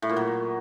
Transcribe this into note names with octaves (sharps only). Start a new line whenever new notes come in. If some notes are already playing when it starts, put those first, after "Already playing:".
A2
A#2
F#3